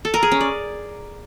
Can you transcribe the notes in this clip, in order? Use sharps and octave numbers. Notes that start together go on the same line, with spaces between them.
A4
A#4
G#4
C#4
D5